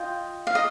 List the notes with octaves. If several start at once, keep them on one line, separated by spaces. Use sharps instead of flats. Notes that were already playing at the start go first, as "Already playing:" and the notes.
Already playing: F4 D#5 G5
F5
D#5